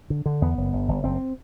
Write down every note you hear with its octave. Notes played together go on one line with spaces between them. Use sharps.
D3
D3
E2 B3
F#1
G1
G1
F#1 C4